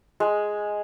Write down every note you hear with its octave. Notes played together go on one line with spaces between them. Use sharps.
G#3